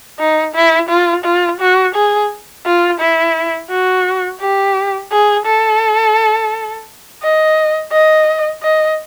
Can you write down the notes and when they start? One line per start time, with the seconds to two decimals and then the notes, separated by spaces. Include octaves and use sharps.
0.19 D#4
0.55 E4
0.89 F4
1.24 F4
1.60 F#4
1.95 G#4
2.66 F4
3.00 E4
3.70 F#4
4.40 G4
5.12 G#4
5.46 A4
7.22 D#5
7.92 D#5
8.63 D#5